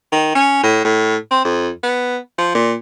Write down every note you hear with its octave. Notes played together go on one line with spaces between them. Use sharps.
D#3
C#4
A2
A2
C4
F2
B3
F3
A#2